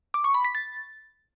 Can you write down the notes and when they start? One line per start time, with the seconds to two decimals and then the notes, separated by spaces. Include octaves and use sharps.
0.14 D6
0.24 C#6
0.34 B5
0.45 B6
0.55 A6